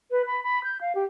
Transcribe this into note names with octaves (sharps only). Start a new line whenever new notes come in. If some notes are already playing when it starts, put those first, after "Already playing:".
B4
B5
B5
G6
F5
G4